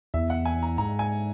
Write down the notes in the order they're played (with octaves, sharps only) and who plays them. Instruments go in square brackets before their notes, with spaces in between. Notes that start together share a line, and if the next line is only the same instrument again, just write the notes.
[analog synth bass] E2 [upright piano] E5
[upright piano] F#5
G#5
A#5
[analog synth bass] G#2 [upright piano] A#5
[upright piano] G#5